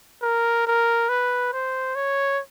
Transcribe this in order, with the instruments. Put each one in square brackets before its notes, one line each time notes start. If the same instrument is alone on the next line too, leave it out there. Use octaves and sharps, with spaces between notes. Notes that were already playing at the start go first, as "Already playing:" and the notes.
[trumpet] A#4
A#4
B4
C5
C#5